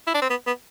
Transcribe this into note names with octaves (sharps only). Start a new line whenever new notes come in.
E4
D4
C4
B3
B3